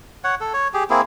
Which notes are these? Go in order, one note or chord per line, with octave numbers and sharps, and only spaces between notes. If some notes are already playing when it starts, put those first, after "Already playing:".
C#5 F#5
A4
C#5
G4 G#4
A#3 C4 E4 G#4